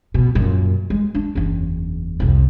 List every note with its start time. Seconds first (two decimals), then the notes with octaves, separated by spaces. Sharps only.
0.14 B2
0.35 F#2 A#2
0.90 G#3
1.15 D4
1.35 F#1 E2
2.20 C2 F2